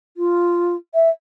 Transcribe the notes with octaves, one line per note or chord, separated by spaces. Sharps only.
F4
E5